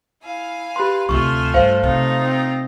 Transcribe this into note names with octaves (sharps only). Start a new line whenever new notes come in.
E4 F5 G#5
G4 B4 C6
D2 C3 A3 F4 E5 G#5 C#6
G2 C5 F5
C3 D#4 F4 A#5
C4